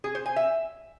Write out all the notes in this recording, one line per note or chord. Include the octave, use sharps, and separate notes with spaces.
G#4
C5
G#5
E5